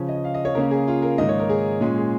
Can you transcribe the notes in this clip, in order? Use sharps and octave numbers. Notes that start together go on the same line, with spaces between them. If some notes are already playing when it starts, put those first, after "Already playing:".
Already playing: C#3 F3 C#4
D#5
F5
D#5
C#5
C#3 A#3 C#4 A#4
G#4
F4
A#4
G#2 D#3 A#3 D#5
C#5
A#4
G#4
A#2 G#3 C#4 G#4
G#4